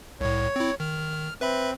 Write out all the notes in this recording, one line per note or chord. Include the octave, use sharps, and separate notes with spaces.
C2 A2 C#5
C4 E4
D#3 F6
C4 B4 E5 B5